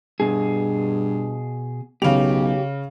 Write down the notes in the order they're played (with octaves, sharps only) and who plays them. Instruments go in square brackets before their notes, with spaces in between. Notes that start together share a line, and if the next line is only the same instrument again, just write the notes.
[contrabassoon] G2 [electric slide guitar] B2 G#4
[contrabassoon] B1 [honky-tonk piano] C#3 F7 [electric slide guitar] G4